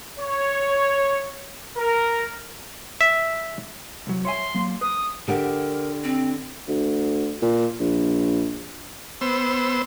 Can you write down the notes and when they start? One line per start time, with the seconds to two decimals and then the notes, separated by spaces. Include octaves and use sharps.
0.19 C#5
1.77 A#4
3.01 E5
4.07 C2 F#3
4.25 C#5 E5 G#5 C6
4.54 F#3 A#3
4.81 B4 D#6
5.28 D3 G4 A#4 F#5
6.04 C4
6.69 D2
7.42 A#2
7.80 A#1
9.21 B3 C5 E6